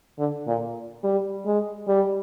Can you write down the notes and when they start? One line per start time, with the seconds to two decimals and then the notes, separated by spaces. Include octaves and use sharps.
0.19 D3
0.47 A#2
1.04 G3
1.46 G#3
1.88 G3